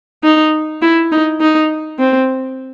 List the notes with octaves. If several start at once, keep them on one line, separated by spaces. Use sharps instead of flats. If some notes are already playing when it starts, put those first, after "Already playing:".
D#4
E4
D#4
D#4
C4